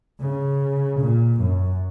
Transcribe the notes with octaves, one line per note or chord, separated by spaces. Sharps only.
C#3
A#2
F#2